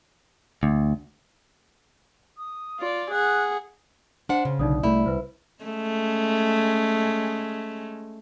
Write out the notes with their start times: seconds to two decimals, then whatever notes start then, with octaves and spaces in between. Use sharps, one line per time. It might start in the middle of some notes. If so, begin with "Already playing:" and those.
0.63 D2
2.37 D#6
2.80 F4 D5
3.11 G#4 F#5 F#6
4.29 D4 C5 F#5 C6
4.45 C#3
4.59 B1 D3 D#4 D5 D#6
4.83 C2 A3 E4 D5 B5
5.06 C2 B4 C5
5.63 G#3 A3 C#4